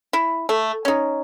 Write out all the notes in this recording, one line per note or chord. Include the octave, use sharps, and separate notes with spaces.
E4
A3
C#4 D#4